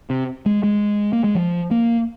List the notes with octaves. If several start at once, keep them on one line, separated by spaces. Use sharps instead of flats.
C3
G#3
G#3
A#3
G#3
F3
A#3